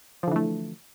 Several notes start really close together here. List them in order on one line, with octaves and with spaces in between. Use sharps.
F3 D3 E3 A3